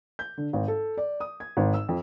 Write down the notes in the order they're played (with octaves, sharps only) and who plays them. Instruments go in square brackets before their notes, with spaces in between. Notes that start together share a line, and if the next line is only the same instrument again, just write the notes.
[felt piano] G6
D3
G#1
A4
D5
D#6
G#6
G#1
E6
F2